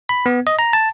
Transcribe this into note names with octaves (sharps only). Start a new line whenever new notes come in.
B5
B3
D#5
A#5
A5